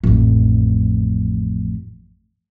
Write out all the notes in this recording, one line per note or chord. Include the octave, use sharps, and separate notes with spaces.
A1 F2